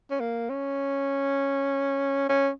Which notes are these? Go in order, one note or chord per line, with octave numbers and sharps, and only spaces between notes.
C#4
A#3
C#4
C#4